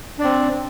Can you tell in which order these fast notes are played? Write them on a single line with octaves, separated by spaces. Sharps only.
D4 D5 C4